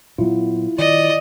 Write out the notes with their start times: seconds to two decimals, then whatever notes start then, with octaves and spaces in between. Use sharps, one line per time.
0.18 A#2 F#3 B3 E4 F4
0.79 D#3 D5 D#5